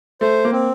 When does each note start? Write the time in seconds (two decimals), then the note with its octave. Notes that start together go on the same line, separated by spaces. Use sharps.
0.21 A3 C5
0.45 A#3
0.52 C4